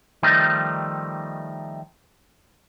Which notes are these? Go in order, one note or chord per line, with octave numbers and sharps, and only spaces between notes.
D#3 F3 G3 A3 D#4